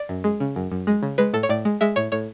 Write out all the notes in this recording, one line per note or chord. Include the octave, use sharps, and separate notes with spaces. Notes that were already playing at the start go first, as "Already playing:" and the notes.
Already playing: D5
F#2
G#3
C#3
F#2
F#2
G#3
C#3
G#3 B4
A2 A4
C#5
A2 D5
G#3
G#3 E5
A2 C#5
A2 C#5